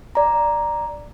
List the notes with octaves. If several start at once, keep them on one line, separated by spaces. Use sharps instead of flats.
D5 A#5